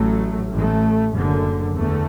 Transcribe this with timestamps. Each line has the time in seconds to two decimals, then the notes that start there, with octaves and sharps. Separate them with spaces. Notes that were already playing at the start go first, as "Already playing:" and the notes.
Already playing: A1 A2 F#3 A3
0.50 A1 A2 A3
1.12 F#1 F#2 D3
1.75 E2 D3 A3